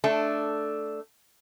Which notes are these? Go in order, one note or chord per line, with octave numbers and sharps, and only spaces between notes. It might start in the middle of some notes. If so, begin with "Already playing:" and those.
A3 D4 A5